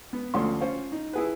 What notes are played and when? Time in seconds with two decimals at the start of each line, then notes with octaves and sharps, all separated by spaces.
0.13 B3
0.34 D2 D3 F3 C#4 F5 C6
0.61 C#4 F4 C5
0.92 D#4
1.13 E4 G#4 B4